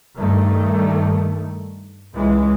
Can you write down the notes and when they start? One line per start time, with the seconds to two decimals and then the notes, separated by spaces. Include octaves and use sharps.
0.17 G2 D#3 A3
2.14 C#2 E3 G#3